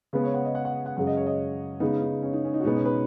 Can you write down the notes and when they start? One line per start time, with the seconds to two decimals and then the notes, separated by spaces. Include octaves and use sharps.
0.13 C#3 G#3 B3 B4
0.24 C#5
0.34 F#5
0.45 D#5
0.55 F#5
0.65 F#5
0.86 F#5
0.97 F#2 C#3 G#3 F#5
1.07 D#5
1.17 C#5
1.27 D#5
1.80 C#3 G#3 B3 D#4
2.02 D#4
2.22 C#4
2.33 D#4
2.44 C#4
2.54 D#4
2.60 F#4
2.64 B2 G#3 B3 D#4
2.76 C#4
2.85 B4